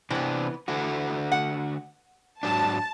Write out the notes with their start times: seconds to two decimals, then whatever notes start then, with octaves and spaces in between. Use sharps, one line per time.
0.10 C3 E3 B3 C4 D4
0.68 D3 E3 A3 F#4
1.32 F#5
2.43 G#2 F#3 D4 A5